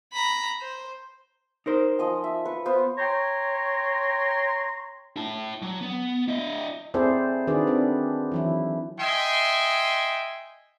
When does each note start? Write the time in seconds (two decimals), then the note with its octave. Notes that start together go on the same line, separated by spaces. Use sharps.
0.12 A#5 B5
0.62 C5
1.66 D#4 A#4 C5
1.99 F3 D#5 G#5
2.24 E5
2.46 B4 C#6
2.65 B3 F4 C5
2.99 C#5 G5 A#5 C6
5.16 E4 A5
5.62 F#3
5.81 B3
6.28 E4 D#5
6.94 C4 E4 G#4 A4 C5 D5
7.47 D#3 D4 F#4 G#4 B4 D5
7.67 C4 D4 A4
8.32 E3 F#3 E4
8.99 D#5 E5 G5 G#5 C6